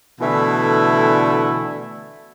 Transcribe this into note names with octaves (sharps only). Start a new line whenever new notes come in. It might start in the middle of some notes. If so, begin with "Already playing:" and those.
B2 D3 E3 A3 E4